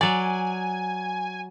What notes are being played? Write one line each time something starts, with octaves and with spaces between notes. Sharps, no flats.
F#3 D5 G#5